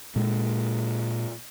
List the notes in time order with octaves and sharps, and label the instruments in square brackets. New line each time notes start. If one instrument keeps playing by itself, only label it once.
[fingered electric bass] A#2 G#3